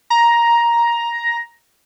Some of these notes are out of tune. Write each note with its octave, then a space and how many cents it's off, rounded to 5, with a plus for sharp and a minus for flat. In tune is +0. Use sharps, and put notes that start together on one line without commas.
A#5 +10